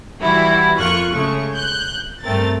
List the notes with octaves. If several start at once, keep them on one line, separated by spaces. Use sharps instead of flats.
E3 G3 E4 F#4
F2 A#3 F4 C#6 F#6
C#3 G#3 A3 C#6
F#6 G6
G2 A3 C4 A#4 A6